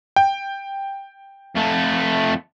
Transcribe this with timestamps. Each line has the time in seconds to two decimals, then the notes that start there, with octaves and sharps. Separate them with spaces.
0.16 G5
1.55 F2 A3